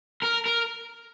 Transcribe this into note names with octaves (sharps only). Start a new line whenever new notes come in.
A#4
A#4